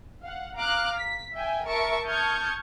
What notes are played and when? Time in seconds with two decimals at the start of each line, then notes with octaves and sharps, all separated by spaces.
0.22 F5 F#5
0.56 F5 A#5 D6 F6 F#6
0.99 B6
1.34 E5 G5 G#5
1.65 A#4 E5 A5 C#6 D7
2.07 A5 C#6 D#6 F6 G6 G#6